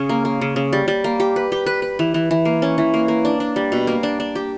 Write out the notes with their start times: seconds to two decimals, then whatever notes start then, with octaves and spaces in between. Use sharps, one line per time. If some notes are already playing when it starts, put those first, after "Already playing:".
Already playing: C#3 C#4
0.09 A#3
0.25 A#3
0.41 C#3
0.56 C#3
0.73 G3
0.88 G3
1.04 A#3
1.20 G4
1.36 B4
1.52 G4
1.66 B4
1.82 B4
1.99 E3
2.14 E3
2.31 E3
2.45 A#3
2.62 C#4
2.78 E3
2.94 A#3
3.08 A#3
3.25 D4
3.40 D4
3.56 G3
3.72 B2
3.87 A#3
4.03 D4
4.20 D4
4.35 G4